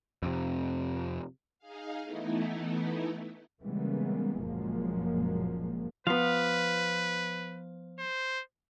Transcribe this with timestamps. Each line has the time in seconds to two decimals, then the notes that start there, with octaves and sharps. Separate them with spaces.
0.23 F2 C3
1.59 D#4 G#4 F5
2.03 E3 A3 B3 D#4 E4
3.63 C#3 E3 G3 G#3 A#3 B3
4.44 F#1 A#2 F3 F#3 G#3 A#3
6.07 F3 B3 B4 F5
7.98 C5